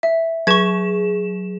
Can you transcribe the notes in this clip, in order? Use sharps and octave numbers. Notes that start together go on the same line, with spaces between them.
E5
F#3 G#4 C#6 G#6 E7